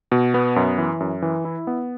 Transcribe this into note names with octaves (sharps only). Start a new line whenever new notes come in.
B2
B3
F#2
E3
F#2
E3
E4
B3